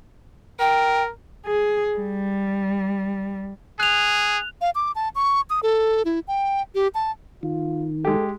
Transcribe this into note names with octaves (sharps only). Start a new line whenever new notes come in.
A#4 G5
G#4
G3
G#4 F#6 F7
F5
D6
A5
C#6
D#6
A4
E4
G5
G4
A5
D#3 F4
G#3 G4 A4